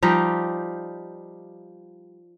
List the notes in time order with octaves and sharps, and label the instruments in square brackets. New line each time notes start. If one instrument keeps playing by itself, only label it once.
[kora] F3 G3 D#4 G4